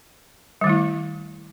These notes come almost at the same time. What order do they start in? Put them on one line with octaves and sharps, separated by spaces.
G3 D#3 A3 E4